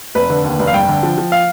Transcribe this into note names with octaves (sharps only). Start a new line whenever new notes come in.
F1 B4
D3
D#2
F1
F5
G2 G5
D3
F3
F3
F5